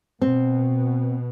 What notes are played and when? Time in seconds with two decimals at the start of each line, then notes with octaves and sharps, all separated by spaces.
0.22 B2 C4